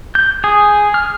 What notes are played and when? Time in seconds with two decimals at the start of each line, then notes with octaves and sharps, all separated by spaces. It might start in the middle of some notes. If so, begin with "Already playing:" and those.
0.15 G6
0.44 G#4
0.94 F6